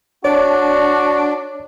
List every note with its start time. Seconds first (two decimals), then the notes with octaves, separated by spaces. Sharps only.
0.25 D4 F#4 C#5 D5